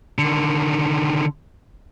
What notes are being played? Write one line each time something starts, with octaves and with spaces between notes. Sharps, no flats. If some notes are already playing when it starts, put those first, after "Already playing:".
D3 D#3